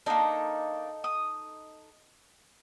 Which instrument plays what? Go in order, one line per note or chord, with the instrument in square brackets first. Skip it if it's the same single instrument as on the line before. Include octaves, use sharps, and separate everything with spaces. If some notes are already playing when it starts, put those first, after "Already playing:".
[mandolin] A#3 D4 [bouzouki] D#4 A4 D#5
[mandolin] D#6